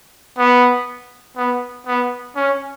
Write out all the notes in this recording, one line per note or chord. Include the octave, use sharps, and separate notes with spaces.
B3
B3
B3
C#4